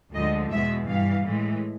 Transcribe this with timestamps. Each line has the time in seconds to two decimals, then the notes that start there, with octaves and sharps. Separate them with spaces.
0.14 D2 D3 F3 G#3 D#5
0.51 E2 B2 G#3 E5
0.88 G2 E3 G3 F5
1.26 A2 E3 G#3